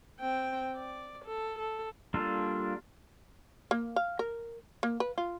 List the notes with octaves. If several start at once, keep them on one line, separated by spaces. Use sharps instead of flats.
C4 G5
D5
A4
A4
G3 A#3 D4 F4 A4
A#3
F5
A#4
A#3
B4
F4